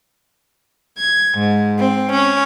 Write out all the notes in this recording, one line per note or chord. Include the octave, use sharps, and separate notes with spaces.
G#6
G#2
C4
C#4